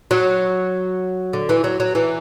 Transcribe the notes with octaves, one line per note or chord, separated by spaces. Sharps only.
F#3
D3
E3
F#3
F#3
E3